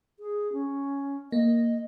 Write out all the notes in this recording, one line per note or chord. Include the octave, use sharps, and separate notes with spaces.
G#4
C#4
A#3 D#5